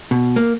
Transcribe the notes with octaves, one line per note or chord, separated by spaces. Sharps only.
B2
A#3